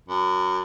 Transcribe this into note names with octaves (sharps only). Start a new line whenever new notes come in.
F#2